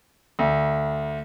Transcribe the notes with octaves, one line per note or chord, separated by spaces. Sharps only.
D2